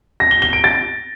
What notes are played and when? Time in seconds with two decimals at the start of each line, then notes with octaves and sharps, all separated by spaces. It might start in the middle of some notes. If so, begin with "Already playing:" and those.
0.20 A#6
0.31 G7
0.42 G7
0.53 D7
0.64 A6